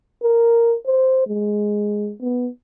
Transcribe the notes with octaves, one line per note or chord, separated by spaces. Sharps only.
A#4
C5
G#3
B3